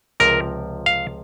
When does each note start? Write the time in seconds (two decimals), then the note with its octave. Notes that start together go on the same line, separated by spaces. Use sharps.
0.20 C#2 C3 F3 A#4
0.86 F5